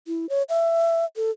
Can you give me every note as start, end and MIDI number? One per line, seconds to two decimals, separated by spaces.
0.07 0.29 64
0.29 0.43 73
0.49 1.05 76
1.16 1.31 69